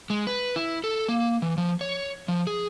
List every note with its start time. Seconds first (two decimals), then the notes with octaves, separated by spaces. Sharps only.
0.10 G#3
0.27 B4
0.56 E4
0.84 A4
1.09 A#3
1.42 E3
1.58 F3
1.81 C#5
2.28 F3
2.47 G#4